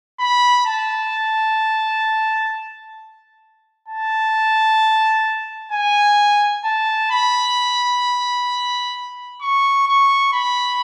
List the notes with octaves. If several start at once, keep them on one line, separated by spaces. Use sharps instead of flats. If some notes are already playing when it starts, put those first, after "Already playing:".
B5
A5
A5
G#5
A5
B5
C#6
C#6
B5